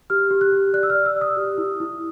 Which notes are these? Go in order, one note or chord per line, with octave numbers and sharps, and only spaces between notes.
G4 F6
G4
F#6
G4
D5 F#6
E6
D5 F6
E6
D5
D#6
G4
E4
E4